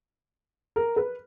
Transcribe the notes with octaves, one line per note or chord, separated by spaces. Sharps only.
A#4
B4